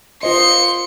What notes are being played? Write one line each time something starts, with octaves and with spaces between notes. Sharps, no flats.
F4 C5 D#5 C6 C#7